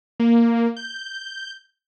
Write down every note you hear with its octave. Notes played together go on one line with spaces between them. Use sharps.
A#3
G6